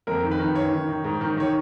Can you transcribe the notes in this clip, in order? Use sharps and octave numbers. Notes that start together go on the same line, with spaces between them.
F2 A#4
D#3
B4
D#3
F#2 C#5
D#3
D#3
G#2
D#3
D#3 C#5